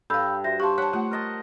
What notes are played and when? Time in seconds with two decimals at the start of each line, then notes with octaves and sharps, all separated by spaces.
0.10 G2 A4 F5 B5 E6 G6
0.44 F#4 C5 E5 A#6
0.60 G4 F5 A5 C6 C#6
0.78 C#5 F#5 A5
0.93 A3 F4 F#5
1.11 A#4 D#5 A5